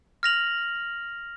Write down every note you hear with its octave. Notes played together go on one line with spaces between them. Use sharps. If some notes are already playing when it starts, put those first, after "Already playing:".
F6 A#6 F7 F#7